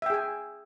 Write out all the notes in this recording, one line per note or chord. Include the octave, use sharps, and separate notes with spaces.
G#4 E5 G5 G#5